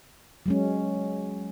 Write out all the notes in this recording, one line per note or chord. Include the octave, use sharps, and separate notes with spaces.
F#3 G#3 C#4